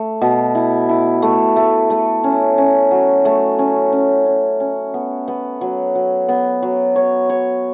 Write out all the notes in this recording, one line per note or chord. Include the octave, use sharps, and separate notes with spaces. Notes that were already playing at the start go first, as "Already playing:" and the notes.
Already playing: A3
B2
E4
E4
A3
A3
A3
C#4
C#4
F#3
A3
C#4
C#4
C#4
C#4
B3
B3
F#3
F#3
B3
F#3
C#5
C#5